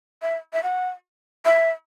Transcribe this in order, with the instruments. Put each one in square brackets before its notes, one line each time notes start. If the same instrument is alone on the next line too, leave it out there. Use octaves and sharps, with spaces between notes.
[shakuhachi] E5
E5
F#5
E5